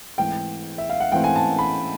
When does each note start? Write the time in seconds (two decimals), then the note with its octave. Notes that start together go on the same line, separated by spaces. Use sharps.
0.18 G#2 E3 A3 C4 G5
0.78 E5
0.90 F5
1.00 F#5
1.12 G#2 E3 A3 C4 G5
1.24 G#5
1.36 A5
1.59 B5